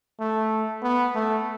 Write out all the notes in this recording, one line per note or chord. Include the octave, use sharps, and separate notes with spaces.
A3
B3
A3